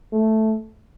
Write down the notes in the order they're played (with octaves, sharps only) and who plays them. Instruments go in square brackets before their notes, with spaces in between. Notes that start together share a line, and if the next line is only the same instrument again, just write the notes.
[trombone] A3